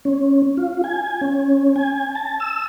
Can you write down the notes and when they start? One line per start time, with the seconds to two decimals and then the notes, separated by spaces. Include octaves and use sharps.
0.05 C#4
0.57 F4
0.84 G#5
1.21 C#4
1.76 G#5
2.15 A5
2.40 E6